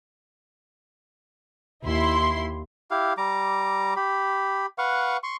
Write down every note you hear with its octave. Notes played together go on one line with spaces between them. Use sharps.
D#2 E4 C6
E4 G4 F5
G3 A#5 D6
G4 B5
B4 F5 F#5 C#6
C6 C#6